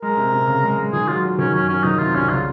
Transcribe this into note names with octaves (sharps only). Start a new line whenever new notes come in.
G#3 A#4
C3
C3
C#3
G#3
G#3
D#3 G#4
F#3 F4
F#3
D#3 C#4
F#2 C#4
F#3 C#4
D#3 D#4
C3 F4
C2 C#4
C#3 F4